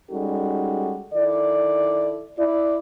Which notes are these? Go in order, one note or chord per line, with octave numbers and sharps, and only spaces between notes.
G3 G#3 C#4 D#4 F#4 A4
D#3 E4 A4 D5
E4 D5